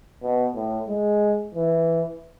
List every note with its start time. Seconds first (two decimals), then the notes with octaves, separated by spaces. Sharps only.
0.23 B2
0.55 A2
0.88 G#3
1.55 E3